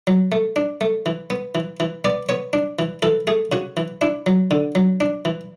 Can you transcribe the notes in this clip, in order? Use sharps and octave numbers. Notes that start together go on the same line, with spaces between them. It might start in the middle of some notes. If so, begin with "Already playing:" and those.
F#3
A3
D4
A3
E3
B3
E3
E3
B3 D5
B3 C#5
D4
E3
E3 A4
A3 G#4
C#3 F#4
E3
D4 E4
F#3
D3
F#3
D4
E3